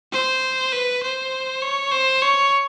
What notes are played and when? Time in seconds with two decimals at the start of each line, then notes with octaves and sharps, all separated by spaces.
0.13 C5
0.73 B4
1.03 C5
1.62 C#5
1.92 C5
2.22 C#5